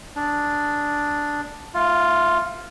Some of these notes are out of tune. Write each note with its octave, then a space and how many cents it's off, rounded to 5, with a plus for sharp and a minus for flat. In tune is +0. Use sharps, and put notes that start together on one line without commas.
D4 +0 G#4 +0
A3 +10 F4 +0 F5 +45